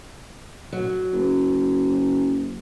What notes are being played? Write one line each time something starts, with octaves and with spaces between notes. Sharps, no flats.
F#3
F#1